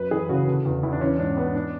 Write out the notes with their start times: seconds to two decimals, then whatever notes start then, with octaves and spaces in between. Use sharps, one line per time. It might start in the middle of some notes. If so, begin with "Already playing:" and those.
Already playing: F#2 B4
0.11 E3 G#4
0.29 C#3 F#4
0.48 D3
0.65 E2
0.83 E2 E4
0.92 D4
1.01 E3 C#4
1.19 G#2 D4
1.37 G#2 B3
1.55 D4